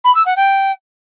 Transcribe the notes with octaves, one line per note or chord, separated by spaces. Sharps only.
B5
E6
F#5
G5